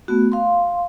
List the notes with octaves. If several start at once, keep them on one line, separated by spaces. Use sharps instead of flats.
A3 B3 F#4
F5 C6